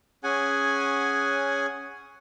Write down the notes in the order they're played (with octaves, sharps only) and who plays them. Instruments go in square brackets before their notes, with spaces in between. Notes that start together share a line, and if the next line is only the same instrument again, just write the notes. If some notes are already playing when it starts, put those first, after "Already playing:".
[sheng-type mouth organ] C#4 G#4 F#5 G#5